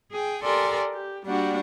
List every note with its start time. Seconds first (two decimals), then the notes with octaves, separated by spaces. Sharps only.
0.10 G#4 G5
0.43 G4 A4 A#4 D5 G#5 C6
0.93 G4
1.26 G3 A#3 D4 F#4 D5 F#5